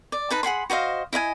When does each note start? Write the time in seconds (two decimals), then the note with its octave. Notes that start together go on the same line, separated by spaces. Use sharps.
0.12 D5
0.30 D#4 B4 A5
0.43 G#4 F#5 B5 C6
0.70 F#4 C5 D#5 F5
1.13 E4 D#5 F5 G#5